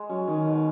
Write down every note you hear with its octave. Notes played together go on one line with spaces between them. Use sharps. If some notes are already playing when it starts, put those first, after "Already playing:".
Already playing: G#3 G#4
F#3 C#4
D#3 C#4
B2